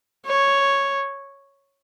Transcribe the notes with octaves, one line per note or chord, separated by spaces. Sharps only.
C#5